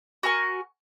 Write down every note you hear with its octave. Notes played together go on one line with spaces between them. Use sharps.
F#4 A#4 G#5 C#6